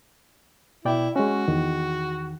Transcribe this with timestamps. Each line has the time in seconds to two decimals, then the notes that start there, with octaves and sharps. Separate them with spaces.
0.85 B2 E4 D5 G5
1.16 G#3 C#4 F#4
1.48 E2 D#3